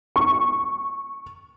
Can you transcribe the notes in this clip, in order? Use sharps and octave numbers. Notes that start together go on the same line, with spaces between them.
C#6